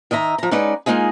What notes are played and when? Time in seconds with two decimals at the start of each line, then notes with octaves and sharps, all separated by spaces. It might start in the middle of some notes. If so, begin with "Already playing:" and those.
0.11 D#3 D#5 E5 A#5
0.38 F3 A#5
0.51 G#3 C#4 D#4 B4 D5 F#5
0.86 G#3 A#3 D#4 F4 G#4